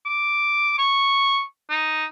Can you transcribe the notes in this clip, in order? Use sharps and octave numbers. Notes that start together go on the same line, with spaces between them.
D6
C#6
D#4